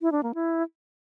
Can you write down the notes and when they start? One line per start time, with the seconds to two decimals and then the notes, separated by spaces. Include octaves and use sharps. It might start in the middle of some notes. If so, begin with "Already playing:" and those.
0.01 E4
0.12 D4
0.23 A#3
0.34 E4